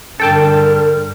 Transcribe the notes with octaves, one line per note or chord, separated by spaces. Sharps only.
G2 D3 A4 A#4 G5 A5